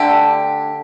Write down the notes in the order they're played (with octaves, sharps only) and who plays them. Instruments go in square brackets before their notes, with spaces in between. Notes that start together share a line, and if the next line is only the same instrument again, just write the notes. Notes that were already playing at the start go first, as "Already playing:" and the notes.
Already playing: [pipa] D3 A3 D4 G4